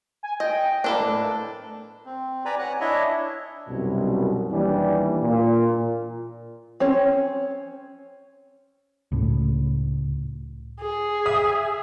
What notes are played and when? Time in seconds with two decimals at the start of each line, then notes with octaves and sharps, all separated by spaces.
0.23 G#5
0.40 D#5 G5
0.84 A#3 D4 A4 B4
1.00 A2
2.06 C4
2.45 B4 D5 G#5 A#5 B5
2.59 C#5 F#5 G#5 F#6
2.81 D4 E4 C#5 D#5 E5
3.68 C2 F#2 B2
4.51 D#2 E3 G3 D4
5.21 A#2
6.80 C4 C#4 C#5
9.12 C#2 A2
10.81 G#4
11.26 E5 D#6